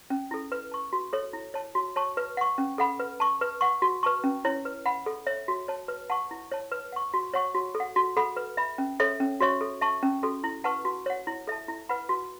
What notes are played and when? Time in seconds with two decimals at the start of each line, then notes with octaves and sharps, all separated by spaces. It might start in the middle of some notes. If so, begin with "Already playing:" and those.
0.10 C#4
0.31 E4 A4
0.52 B4
0.72 A5 C#6
0.93 F#4
1.13 A4 C#5
1.33 E4
1.54 C#5 A5
1.75 F#4
1.96 C#5 A5 C#6
2.17 B4
2.37 F#5 C#6
2.58 C#4
2.78 A4 F#5 B5
2.99 B4
3.20 A5 C#6
3.41 B4
3.61 F#5 C#6
3.82 F#4
4.03 B4 A5 C#6
4.24 C#4
4.45 E4 C#5
4.65 B4
4.86 F#5 B5
5.06 A4
5.27 C#5 E5
5.48 F#4
5.68 C#5 A5
5.88 B4
6.10 F#5 A5 C#6
6.31 E4
6.52 C#5 A5
6.72 B4
6.92 F#5 C#6
7.14 F#4
7.34 C#5 F#5 C#6
7.54 F#4
7.75 A4
7.80 F#5
7.96 F#4
8.17 A4 F#5 B5
8.37 B4
8.57 E5 B5
8.78 C#4
9.00 A4 C#5 E5
9.20 C#4
9.40 F#4 C#5 E5 C#6
9.61 A4
9.81 E5 A5 C#6
10.03 C#4
10.23 F#4 A4
10.44 E4
10.64 B4 F#5 A5 C#6
10.85 F#4
11.06 C#5 F#5
11.27 E4
11.47 A4 E5 A5
11.68 E4
11.89 B4 F#5 B5
12.09 F#4